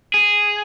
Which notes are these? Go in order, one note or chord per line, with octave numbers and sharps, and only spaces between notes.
G#4